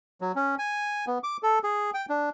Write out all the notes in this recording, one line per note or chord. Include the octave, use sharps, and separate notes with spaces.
F#3
C#4
G#5
B3
D6
A4
G#4
G5
D4